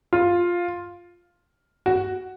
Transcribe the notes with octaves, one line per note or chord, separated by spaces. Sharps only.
F4
F#4